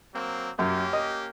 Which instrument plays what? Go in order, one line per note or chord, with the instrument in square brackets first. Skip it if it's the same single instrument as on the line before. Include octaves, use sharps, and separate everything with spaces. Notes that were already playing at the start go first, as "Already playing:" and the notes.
[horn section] F#3 A#3 C4
[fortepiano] F#2 [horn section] A#3 C#4 G4
[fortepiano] D#5